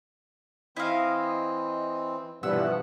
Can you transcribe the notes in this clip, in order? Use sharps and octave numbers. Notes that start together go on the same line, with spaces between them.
E3 C4 E4 D#5 F5
G2 B2 E3 F3 B3 F#5 E6